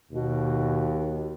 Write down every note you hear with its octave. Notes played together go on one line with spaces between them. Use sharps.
D#2 B2